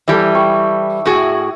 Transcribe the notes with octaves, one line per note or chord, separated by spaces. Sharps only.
E3 G3 A4 E5
G5 C#6
A2 F#4 G#4